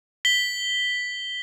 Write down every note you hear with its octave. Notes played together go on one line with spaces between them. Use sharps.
B6 G7